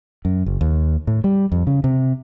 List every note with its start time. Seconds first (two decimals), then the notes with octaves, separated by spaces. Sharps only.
0.25 F#2
0.46 F#1
0.61 D#2
1.07 A2
1.24 G3
1.52 F2
1.67 C#3
1.84 C3